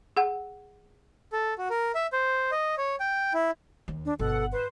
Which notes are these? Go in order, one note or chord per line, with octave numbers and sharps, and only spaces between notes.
G#4 F#5
A4
F#4
A#4
E5
C5
D#5
C#5
G5
E4
D#2
D4
G1 B2 A4 F#5
B4 C5